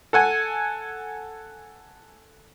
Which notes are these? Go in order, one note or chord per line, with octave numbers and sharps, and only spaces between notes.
A4 F#5 G#5